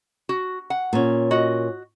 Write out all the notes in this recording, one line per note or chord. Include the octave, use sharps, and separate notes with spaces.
F#4
F#5
A#2 C#4
F#4 D#5